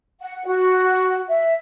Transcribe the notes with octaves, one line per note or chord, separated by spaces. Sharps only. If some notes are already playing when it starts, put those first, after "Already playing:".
F#5
F#4
E5